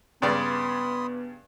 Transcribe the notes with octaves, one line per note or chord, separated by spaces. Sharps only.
G2 C#3 B3 D5 B5 C6 D#6